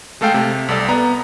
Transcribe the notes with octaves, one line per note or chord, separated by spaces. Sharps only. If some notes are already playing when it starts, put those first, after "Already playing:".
G#3 A3 A4 F5 G5
C3
C2 A4 D5
B3 A#5